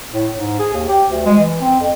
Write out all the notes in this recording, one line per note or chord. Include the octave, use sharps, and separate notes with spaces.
A2
G#2
G#4
D#2
G4
D2
G#3
E3
C4
F2